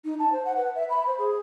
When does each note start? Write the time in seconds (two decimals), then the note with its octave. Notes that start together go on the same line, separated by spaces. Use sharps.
0.05 D#4
0.19 A5
0.32 C5
0.45 F#5
0.56 B4
0.75 E5
0.90 B5
1.07 C5
1.18 G#4